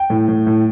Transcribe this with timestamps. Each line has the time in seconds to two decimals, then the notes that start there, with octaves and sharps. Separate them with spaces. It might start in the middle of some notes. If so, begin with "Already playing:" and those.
Already playing: G5
0.10 A2
0.28 A2
0.47 A2